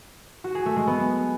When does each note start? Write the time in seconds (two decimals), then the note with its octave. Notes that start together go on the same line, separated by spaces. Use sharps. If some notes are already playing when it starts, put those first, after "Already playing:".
0.44 F#4
0.55 G#4
0.66 A3
0.76 G#3
0.87 B3